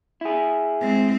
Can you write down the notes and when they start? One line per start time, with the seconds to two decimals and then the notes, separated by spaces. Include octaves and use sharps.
0.21 E4 G#4
0.81 G#3 C4